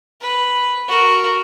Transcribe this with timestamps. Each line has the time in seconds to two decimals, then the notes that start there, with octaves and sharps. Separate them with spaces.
0.21 B4
0.88 F#4 A#4